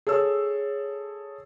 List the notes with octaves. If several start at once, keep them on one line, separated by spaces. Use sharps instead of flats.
G#4 A4 C#5 E6